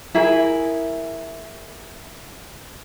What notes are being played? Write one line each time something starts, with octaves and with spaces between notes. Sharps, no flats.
E4 G#4 A#4